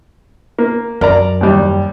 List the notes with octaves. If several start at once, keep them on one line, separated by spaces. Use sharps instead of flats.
A#3
F#2 A#4 D5 A#5
D#2 G3